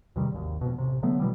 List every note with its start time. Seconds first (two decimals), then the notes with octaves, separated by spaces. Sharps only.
0.16 E2 C3 D#3 G3
0.31 G#1 D#2
0.61 F2 B2
0.78 A1 C3
1.03 D3 F#3 A3 B3
1.20 B2 E3 G3